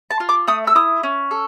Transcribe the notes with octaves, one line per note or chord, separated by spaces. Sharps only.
A5
F4
D6
A3 D#6
E6
E4 D#6
C#4
A4